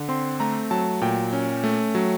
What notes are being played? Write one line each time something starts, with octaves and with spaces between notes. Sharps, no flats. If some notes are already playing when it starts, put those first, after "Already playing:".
Already playing: D3
C4 C6
A3 A#5
F#3 A5
A#2 G5
C#4
A3
F#3